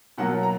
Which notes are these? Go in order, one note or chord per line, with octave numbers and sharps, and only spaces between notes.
B2 F#3 A#3 F#5
A#5